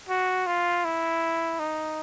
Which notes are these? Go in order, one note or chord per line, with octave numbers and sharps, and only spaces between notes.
F#4
F4
E4
D#4